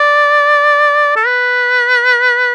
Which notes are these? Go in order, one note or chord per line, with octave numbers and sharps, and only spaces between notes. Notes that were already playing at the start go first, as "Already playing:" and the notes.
Already playing: D5
A4
B4